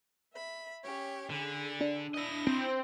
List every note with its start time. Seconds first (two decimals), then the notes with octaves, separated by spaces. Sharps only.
0.32 E5 B5
0.82 C#4 G4 C#5
1.30 D3 G#4 B5
1.81 D4
2.14 E4 D#5 A#6
2.47 C4